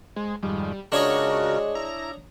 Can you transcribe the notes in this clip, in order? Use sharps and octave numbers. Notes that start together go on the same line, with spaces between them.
G#3 C5 G#5
F2 G#2 D#3 G3
C#3 G#3 D4 F4 F#4 A#4 C#5 D#5
E4 A#5